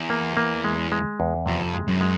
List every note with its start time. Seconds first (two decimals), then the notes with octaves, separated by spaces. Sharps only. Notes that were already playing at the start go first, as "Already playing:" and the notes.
Already playing: E2
0.10 A#3
0.37 A#3
0.64 G#3
0.92 G#3
1.20 E2
1.46 F2 C3
1.74 G#3
1.88 F#2
2.01 G#3